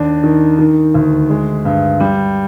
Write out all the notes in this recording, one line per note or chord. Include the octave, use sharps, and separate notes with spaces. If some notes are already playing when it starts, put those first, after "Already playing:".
Already playing: D#2 D4
D#3
D#3
D2
G#3
G2
G3